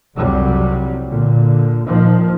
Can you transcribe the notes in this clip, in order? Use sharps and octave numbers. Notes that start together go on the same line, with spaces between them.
C2 F2 F#3 G3
A#2 D3
A#2 D#3 F3